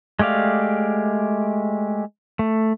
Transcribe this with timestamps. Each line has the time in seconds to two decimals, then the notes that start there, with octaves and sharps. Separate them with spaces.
0.19 G#3 A3 G4 D5 F5
2.39 A3